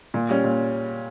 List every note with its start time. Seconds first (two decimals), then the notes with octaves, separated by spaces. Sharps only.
0.14 A#2
0.29 G3 C#4
0.44 A#2